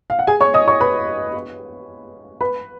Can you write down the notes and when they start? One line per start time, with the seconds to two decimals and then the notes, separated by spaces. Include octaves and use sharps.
0.10 F5
0.19 F#5
0.27 G#4 G#5
0.41 C#5 C#6
0.54 D#5 D#6
0.68 C#5 C#6
0.80 B4 B5
2.41 B4 B5